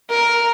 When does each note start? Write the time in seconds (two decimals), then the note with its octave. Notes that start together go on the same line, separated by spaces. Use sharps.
0.10 A#4